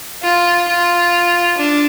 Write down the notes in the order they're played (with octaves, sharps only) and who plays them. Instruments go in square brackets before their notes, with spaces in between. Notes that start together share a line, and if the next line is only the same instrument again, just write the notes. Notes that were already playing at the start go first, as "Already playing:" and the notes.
[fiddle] F4
F4
D4